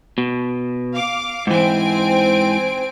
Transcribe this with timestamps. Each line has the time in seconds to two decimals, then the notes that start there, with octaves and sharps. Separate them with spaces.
0.18 B2
0.94 F5 D6
1.47 G#2 E3 C4 G#5 D7